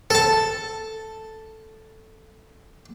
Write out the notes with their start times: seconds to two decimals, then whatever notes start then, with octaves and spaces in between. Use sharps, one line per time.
0.10 A4 A5